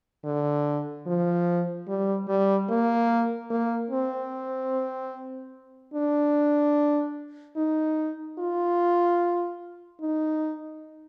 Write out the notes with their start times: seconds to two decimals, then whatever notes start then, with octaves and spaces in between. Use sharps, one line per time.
0.25 D3
1.06 F3
1.88 G3
2.28 G3
2.69 A#3
3.50 A#3
3.91 C4
5.94 D4
7.56 D#4
8.39 F4
10.01 D#4